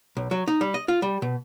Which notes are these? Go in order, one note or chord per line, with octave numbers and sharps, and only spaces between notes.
B1
F#3
D#4
G3
D#5
F4
G3
B2